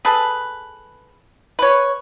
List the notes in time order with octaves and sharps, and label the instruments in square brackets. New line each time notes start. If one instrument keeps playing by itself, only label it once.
[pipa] G#4 A4 B4
B4 C#5